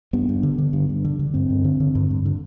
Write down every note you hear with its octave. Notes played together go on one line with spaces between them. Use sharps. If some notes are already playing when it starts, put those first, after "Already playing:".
G2 B3
G2
D3
D3
G2
G2
D3
D3
G2 C4
G2
D3
D3
G2
G2
D3